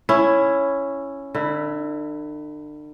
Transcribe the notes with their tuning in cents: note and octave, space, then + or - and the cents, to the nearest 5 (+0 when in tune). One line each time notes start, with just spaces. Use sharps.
C#4 +0 E4 +10
D3 +40 E4 +0